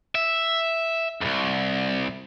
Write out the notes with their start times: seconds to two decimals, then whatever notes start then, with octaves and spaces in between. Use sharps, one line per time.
0.15 E5
1.21 C2 F2